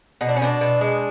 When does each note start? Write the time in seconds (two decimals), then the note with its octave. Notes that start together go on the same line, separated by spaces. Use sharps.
0.21 B2 D#4
0.29 D4
0.36 C#4
0.42 B2 D4
0.61 B2
0.81 G#3